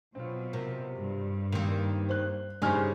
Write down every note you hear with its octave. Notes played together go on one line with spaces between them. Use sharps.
B2 F#3 C4 F4
C3 A#4
G2
D#3 A#3 C4 F7
C5 F#6
G2 C#3 D#4 C5 G#5 F6